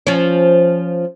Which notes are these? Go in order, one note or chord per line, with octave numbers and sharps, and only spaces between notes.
F3 C#4